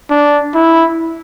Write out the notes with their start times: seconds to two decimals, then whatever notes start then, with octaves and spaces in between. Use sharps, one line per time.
0.10 D4
0.55 E4